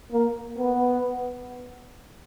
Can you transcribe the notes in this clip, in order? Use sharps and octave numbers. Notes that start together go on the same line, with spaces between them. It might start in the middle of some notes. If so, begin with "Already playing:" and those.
A#3
B3